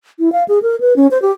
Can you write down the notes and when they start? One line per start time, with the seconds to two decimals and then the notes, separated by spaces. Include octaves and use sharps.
0.19 E4
0.32 F5
0.48 G#4
0.63 A#4
0.80 B4
0.96 C#4
1.11 C5
1.22 G4